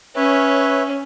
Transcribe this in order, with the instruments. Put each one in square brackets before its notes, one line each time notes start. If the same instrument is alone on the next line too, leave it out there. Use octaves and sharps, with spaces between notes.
[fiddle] C#4 [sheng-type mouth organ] B4 C#5 E5